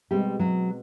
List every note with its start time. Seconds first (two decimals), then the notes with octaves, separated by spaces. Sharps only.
0.11 B2 G3 G#3 C4 G4
0.39 F#3 F#4